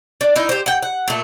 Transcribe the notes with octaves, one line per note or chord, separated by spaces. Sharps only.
D4
D#4 E4 A#4
G4 C5
F#5 G5
F#5
A#2 A3